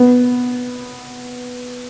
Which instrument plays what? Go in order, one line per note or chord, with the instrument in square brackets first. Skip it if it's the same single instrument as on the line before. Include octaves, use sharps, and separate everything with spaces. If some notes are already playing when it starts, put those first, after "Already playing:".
Already playing: [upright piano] B3